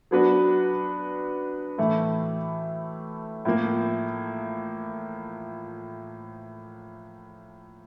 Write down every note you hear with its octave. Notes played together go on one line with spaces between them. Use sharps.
F#3 B3 D4 F#4 B4
A2 E3 A3
A2 F3 A#3